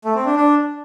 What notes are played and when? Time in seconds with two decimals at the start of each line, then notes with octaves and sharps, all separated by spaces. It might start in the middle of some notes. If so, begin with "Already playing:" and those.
0.05 A3
0.15 C4
0.26 D4
0.36 D4